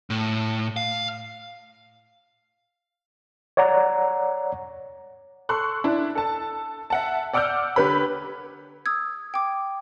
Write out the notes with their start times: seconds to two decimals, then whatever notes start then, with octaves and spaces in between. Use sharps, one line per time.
0.10 A2
0.77 F5
3.57 C#5 D5 F#5 A#5
5.49 A4 C6 C#6 F#6
5.84 D4 E4
6.15 A4 A5
6.90 E5 F#5 A5
7.33 D5 F#5 D6 E6 F6 G6
7.76 D3 G4 B4 C#5 B5
8.86 D#6 E6 G#6
9.34 G5 D6